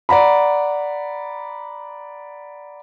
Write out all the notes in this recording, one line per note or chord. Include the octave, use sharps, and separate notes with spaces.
D5 F#5 A#5 B5